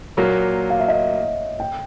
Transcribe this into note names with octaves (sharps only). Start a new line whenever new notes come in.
A#2 F#3 A#3 C#5
F5
E5
D#5
G5